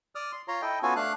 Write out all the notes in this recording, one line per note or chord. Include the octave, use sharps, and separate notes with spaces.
D5 D#6 F6
C6
F4 C#5 A#5 C6
E4 A4 D#5 G5
B3 C#4 F4 F#4 A4 G#5
A3 D4 F5 F#6